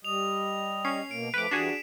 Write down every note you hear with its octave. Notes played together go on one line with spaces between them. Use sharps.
G3 D#5 F7
C#4 C7
B2 A#3 D7
F3 A3 C4 B4 D6 B6
E3 G3 D4 F#4 G#4 E7